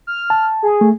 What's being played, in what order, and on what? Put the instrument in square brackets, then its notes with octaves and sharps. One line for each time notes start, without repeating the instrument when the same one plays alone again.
[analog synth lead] F6
[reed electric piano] A5
[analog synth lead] G#4
[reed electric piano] A3